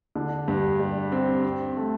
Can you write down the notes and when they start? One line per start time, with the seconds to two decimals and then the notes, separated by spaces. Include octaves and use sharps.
0.16 D3
0.48 G2
0.80 G3
1.12 C4
1.45 C4
1.77 A3